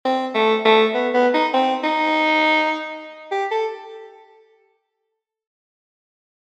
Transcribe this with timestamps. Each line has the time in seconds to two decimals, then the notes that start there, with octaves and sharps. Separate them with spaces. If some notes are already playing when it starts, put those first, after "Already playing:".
0.05 C4
0.35 A3
0.65 A3
0.94 B3
1.14 B3
1.34 D#4
1.54 C4
1.84 D#4
3.32 G4
3.51 A4